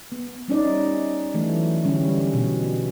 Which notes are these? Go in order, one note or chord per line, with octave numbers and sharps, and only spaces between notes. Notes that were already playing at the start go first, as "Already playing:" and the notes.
B3
G3 C#4 D#4 D5
E3 F#3 A3
D3 G3 C#4
B2